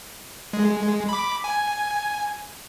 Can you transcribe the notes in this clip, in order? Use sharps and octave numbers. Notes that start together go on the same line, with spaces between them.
G#3
B5 D6
G#5